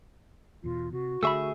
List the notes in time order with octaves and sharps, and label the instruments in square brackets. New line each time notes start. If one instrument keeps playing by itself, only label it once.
[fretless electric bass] E2 B2 [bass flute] F4
[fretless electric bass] C3 [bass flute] F#4
[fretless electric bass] D3 [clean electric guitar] A3 G#4 E5 [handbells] B5 C#6 E6